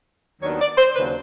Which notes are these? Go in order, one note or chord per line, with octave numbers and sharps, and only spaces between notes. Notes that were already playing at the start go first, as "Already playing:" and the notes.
D#2 D#3 F#3 B3 D4 C#5
D5
C5
D#2 C#3 F#3 A#3 D4 B4